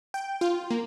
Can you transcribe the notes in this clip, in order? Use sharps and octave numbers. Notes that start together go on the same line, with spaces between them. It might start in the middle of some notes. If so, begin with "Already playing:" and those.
G5
F4
A#3